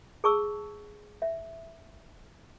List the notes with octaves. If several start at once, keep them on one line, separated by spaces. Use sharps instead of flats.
G#4 A5 C#6 E6
E5